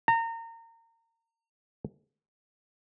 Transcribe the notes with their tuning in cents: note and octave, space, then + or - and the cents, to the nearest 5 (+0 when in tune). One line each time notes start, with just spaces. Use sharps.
A#5 -30